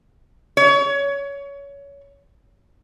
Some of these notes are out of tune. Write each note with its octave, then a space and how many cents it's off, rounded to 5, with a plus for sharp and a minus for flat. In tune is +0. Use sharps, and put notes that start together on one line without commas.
C#5 +20